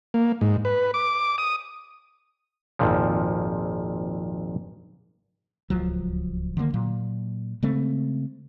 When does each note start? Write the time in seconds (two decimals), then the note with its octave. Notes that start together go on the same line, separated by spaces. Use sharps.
0.14 A#3
0.41 G#2
0.65 B4
0.94 D6
1.38 D#6
2.79 G#1 F2 A#2 F3
5.70 D1 C#2 F3 F#3
6.57 D3 D#3 G3 A#3
6.74 A#2 F#3
7.63 C#3 G#3 A3 C4